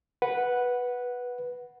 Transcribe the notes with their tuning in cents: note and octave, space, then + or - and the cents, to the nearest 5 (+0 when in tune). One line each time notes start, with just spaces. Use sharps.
B4 -5 F#5 +0